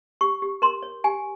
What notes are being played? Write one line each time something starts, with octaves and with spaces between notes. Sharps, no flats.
G4 C#6
G4
A#4 C6
C#5
G4 G#5